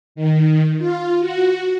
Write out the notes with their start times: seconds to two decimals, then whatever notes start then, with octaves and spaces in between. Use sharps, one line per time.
0.15 D#3
0.78 F4
1.20 F#4